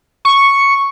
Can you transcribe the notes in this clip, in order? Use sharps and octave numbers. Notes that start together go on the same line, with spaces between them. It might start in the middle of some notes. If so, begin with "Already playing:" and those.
C#6